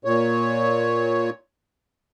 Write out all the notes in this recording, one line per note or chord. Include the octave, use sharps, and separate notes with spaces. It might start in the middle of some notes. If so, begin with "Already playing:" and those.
A#2 C#5